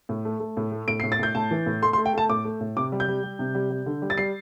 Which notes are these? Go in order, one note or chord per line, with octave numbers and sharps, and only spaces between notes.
A2
A3
A3
A2
A3
A2 D7
C7
A2
A6
A2 G6
A2 A5
E3
A2
A3 C6
C6
A3
G5
A3 A5
A2 D6
A3
A2
C3 D6
G3
G6
G3
G3
C3
G3
G3
D3
G3
A6
G3 C7